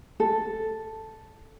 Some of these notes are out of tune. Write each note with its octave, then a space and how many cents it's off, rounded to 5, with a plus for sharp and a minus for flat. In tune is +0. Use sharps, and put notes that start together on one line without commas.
A4 +0